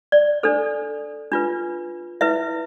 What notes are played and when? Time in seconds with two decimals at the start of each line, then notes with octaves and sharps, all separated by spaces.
0.12 D5
0.43 D4 A4 C5
1.32 D4 F4 B4
2.21 E4 B4 E5